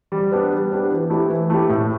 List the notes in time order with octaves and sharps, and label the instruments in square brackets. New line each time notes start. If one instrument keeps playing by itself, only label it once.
[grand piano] G3
B3 D4 G4
G3
B3 D4 G4
E3
A3 E4 G4
E3
A3 E4 G4
A2